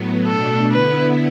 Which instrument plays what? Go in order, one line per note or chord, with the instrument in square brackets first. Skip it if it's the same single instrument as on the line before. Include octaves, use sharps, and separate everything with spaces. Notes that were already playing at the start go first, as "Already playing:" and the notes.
Already playing: [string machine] A2 F#3 B3
[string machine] B2 A3 D4 [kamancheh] A4
[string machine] D3 B3 E4 [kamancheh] B4